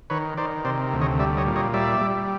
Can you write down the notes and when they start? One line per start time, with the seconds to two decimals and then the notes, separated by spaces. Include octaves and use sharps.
0.10 D#3 B4 C#5
0.37 D#3 C5 D5
0.65 C3 C5 D5
0.93 D2
1.01 C#5 D#5
1.19 G3 D5 E5
1.37 C#5 D#5
1.46 A#2
1.56 C#5 D#5
1.74 G3 D5 E5
2.01 G3